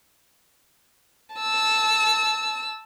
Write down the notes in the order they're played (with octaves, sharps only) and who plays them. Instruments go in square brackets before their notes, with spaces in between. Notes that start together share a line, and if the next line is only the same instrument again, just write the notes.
[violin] A5 E6